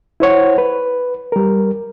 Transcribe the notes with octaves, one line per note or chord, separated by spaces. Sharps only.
E4 C5 C#5 F#5
B4
G3 A#4